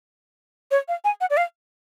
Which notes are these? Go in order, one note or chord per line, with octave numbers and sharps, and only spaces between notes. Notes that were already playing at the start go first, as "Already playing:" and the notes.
C#5
F5
G#5
F#5
D5
F5